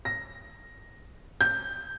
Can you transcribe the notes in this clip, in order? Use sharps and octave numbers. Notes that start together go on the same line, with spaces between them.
A#6
G6